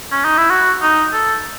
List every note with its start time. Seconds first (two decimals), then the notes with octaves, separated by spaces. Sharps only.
0.12 C#4
0.25 D#4
0.37 E4
0.50 F#4
0.82 D#4
1.13 A4